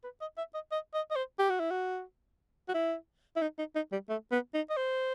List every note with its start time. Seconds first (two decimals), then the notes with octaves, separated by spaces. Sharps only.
0.04 B4
0.21 D#5
0.38 E5
0.54 D#5
0.72 D#5
0.94 D#5
1.11 D#5
1.16 C5
1.39 G4
1.50 F#4
1.60 E4
1.71 F#4
2.69 F#4
2.74 E4
3.36 E4
3.42 D#4
3.59 D#4
3.76 D#4
3.92 G3
4.09 A3
4.32 B3
4.54 D#4
4.70 D#5
4.77 C5